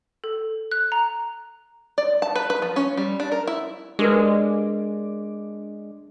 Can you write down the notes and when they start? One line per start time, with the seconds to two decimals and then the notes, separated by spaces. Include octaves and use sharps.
0.24 A4
0.71 F#6
0.92 A#5
1.98 D5
2.22 A5
2.36 B4
2.50 B4
2.62 F3
2.76 C#4
2.97 G3
3.20 D4
3.32 A#4
3.47 E4
3.99 G#3 D4 G4 A#4 B4 D6